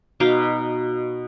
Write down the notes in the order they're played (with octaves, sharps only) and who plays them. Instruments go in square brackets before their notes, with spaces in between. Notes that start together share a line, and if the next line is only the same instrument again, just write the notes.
[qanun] B2 D#4 F5 D6